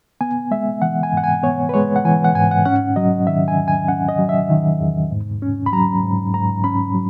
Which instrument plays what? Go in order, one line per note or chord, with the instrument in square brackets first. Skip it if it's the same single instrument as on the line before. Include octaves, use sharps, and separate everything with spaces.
[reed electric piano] B3 G#5
G#3 E5
E3 F#5
G#5
G#2 F#5
G#5
B3 C#5
B4
G#3 C#5
F#5
E3 G#5
F#5
G#2 G#5
F#5
C#4 F#5
F#3 D#5
D#3 E5
G#5
E2
G#5
C#4 F#5
D#5
F#3
E5
D#3
E2
G#2
C#4
B5
F#3 A#5
G#2
G#2 A#5
C#4 B5
F#3